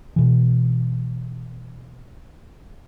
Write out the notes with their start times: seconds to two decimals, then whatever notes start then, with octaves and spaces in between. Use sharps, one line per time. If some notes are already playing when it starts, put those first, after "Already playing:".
0.16 B2 E3